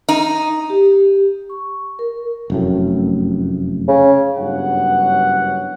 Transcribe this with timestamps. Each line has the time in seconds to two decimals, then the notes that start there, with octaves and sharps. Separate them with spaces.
0.09 D#4
0.70 G4
1.50 C#6
1.99 A#4
2.50 F1 F#2 A2
3.88 C#3
4.38 F#1 G2 B3 C#5 F#5